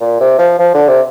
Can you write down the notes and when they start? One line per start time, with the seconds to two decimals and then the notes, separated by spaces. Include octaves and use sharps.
0.01 A#2
0.20 C3
0.39 F3
0.59 F3
0.74 D3
0.88 C3